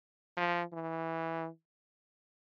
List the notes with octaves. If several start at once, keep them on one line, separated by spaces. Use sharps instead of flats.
F3
E3